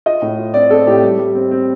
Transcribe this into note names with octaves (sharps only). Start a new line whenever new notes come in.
F4 D#5
A2
F4
C4 D5
C4 A4
A2 G4
G3
G3
C4
C4